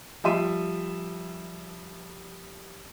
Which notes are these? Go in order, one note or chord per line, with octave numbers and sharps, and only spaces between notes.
F3 G3 E5 C6 D#7